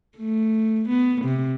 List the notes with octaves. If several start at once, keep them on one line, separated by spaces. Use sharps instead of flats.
A3
B3
C3